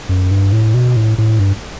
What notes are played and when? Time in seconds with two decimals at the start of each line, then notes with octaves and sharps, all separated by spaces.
0.09 F#2
0.31 G2
0.52 A2
0.74 B2
0.96 A2
1.18 A2
1.39 G2